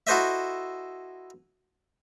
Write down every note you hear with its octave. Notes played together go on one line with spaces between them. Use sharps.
E4 F#4 A4 C5 D#5 E5